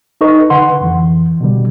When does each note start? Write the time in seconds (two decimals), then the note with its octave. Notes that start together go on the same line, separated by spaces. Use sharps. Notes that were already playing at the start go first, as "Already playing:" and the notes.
0.21 D#4 A4 B4 D#5 C#6
0.50 D3 B4 F#5 C6
0.81 F2 E3
1.41 B2 D3 G3